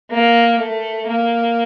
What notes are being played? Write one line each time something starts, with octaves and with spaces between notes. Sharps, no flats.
A#3
A3
A#3